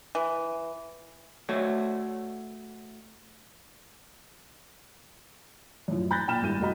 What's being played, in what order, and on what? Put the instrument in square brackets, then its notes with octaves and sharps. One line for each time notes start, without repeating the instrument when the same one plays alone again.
[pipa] E3
[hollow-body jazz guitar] A3 F#4 C#5
[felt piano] F#2 A2 F3
B5 F#6 G6 A6 A#6
A#2 G5 B5 F6 E7
G#1 G3 E4 G6 D#7
F1 G3 F#4 D#5 B5